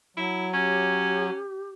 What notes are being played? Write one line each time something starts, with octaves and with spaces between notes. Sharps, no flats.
F#3 E4
C#4 G4